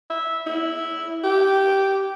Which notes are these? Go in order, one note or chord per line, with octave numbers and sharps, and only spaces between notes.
E5
E4
G4